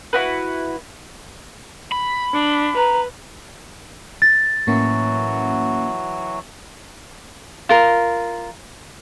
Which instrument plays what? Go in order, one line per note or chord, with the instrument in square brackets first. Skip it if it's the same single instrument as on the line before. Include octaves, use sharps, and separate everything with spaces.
[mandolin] E4 F#4 B4
[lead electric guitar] B5
[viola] D4
[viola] B4 [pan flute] A#5
[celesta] A6
[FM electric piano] A2 A#3 C#4 [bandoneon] E3 F#3 F#4
[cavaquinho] F4 A#4